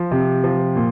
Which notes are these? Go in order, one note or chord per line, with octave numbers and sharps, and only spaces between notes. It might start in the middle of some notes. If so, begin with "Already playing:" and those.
Already playing: F3
C3
F3
A#2